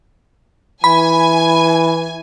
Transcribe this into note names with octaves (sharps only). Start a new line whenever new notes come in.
E3 G#5 B5